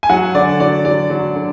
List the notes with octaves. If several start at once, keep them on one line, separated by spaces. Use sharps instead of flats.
G#5
F#3 F#5
D3 D5
F#3 D5
F#3 D5
F#3
D3